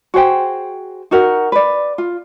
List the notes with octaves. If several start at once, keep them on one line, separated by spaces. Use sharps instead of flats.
F#4 G#4 C5 G5
D#4 F#4 A#4 F#5
B4 D5
F4